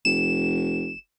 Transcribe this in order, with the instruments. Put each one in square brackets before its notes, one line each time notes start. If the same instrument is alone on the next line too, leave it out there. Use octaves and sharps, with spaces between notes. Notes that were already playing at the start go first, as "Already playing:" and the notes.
[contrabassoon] F1 [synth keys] E7